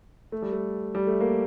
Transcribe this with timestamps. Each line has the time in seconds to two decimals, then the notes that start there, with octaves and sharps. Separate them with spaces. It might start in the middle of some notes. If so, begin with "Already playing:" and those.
0.32 A3
0.42 G3
0.53 A3
0.95 G3
1.07 A3
1.21 A#3